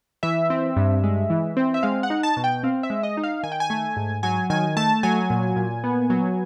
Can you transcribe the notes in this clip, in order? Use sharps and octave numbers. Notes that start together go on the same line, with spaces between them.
E3 E5
C4
G2
G#3
E3
C4
E5
G#3 F5
F#5
D#4
A5
B2
G5
C4 F5
E5
G#3
D#5
D#4
F5
D#3 G#5
G5
G#5
A3
G#2
F#3 G#5
D#3 G#5
A3 A5
F#3 G#5
A#2
A#2
B3
F#3